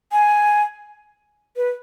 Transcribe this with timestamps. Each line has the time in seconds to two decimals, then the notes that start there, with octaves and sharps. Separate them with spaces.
0.12 G#5
1.57 B4